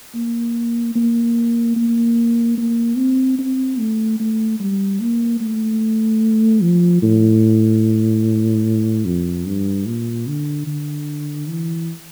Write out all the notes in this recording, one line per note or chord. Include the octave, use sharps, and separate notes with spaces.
A#3
A#3
A#3
A#3
C4
C4
A3
A3
G3
A#3
A3
F3
A2
F2
G2
A#2
D3
D3
E3